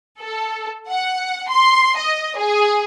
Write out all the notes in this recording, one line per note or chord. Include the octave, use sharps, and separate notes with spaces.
A4
F#5
C6
D#5
G#4